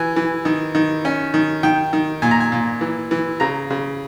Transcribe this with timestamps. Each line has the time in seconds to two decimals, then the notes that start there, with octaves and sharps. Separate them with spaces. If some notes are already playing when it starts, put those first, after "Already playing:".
Already playing: E3 G#5
0.16 E3
0.45 D#3
0.75 D#3
1.05 C#4
1.34 D#3
1.63 D#3 G5
1.93 D#3
2.22 A#2 G#5
2.31 A#5
2.40 G#5
2.52 A#2
2.81 E3
3.11 E3
3.40 C#3 A#5
3.70 C#3